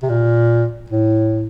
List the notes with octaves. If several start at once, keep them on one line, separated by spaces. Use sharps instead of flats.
C3
A#2
A2